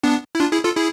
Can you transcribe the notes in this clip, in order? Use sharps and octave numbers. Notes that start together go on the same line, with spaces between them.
B3 D4
E4
D4 F4
E4 G#4
F4 A4
E4 G#4